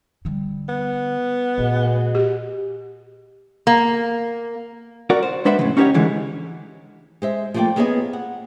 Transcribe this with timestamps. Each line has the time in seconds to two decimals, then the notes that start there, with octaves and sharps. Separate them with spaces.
0.25 D3 G3
0.69 B3
1.58 A#2 A3 F#4 G#4 D#5
2.15 G4
3.67 A#3
5.10 F#4 A#4 D5 F#5
5.23 C5
5.45 G#3 D4 B4 C5 E5 F#5
5.59 F2 A2 C#3 E3
5.77 C#4 D#4 G4 A4 C#5 F#5
5.94 C#2 D3 E3 G#3 A3
7.22 G#3 C5 E5
7.54 F3 A3 A#3 F4 D5 G5
7.76 A#3 B3 G#4 C#5 D#5 G#5
8.13 F#5